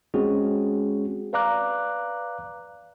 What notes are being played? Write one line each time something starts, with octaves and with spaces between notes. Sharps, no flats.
G#3 C4 C#4 F#4 G#4
B4 D5 F5 A#5 D6 F#6